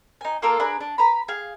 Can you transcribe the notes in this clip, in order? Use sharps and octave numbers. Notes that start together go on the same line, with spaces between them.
D#4 G#5
A#3 F4 A4 A#4
D4 G#4 B4 A#5
D4
B4 A#5 B5
G#4 F5